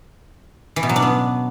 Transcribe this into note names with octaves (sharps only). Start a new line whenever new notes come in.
E3
B2
F#3
D4
B3